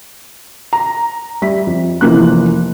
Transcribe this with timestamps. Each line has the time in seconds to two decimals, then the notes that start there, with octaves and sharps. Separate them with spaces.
0.73 A#5
1.42 G3 E5 B6
1.67 F2
2.01 F1 E3 F3 A#3 F#6